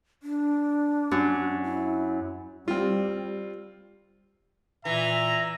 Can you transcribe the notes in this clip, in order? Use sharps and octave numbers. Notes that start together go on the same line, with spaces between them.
D4
F#2
E4
G3 C4 F4
A#2 E3 E5 A#5